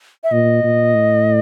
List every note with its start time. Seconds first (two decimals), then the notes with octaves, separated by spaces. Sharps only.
0.24 E5
0.32 A#2 D#5
0.64 A#2
0.95 A2